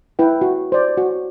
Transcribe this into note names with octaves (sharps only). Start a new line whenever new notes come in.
E4 B4 G5
F#4
C5 D5
F#4